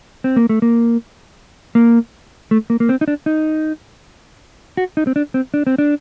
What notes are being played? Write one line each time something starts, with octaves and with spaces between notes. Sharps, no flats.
C4
A#3
A3
A#3
A#3
A3
A#3
A#3
C4
D#4
D4
D#4
F#4
D#4
C4
D4
C4
D4
C4
D4